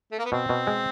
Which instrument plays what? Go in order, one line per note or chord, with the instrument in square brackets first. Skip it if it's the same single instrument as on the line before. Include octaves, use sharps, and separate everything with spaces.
[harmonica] A3
A#3
B3
[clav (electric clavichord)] B2 [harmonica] C4
[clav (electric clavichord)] B2
G#3